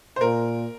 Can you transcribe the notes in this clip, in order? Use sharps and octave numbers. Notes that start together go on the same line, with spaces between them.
C5
A#2 A#4